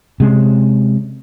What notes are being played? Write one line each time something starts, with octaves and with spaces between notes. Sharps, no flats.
C3 G#3 C#4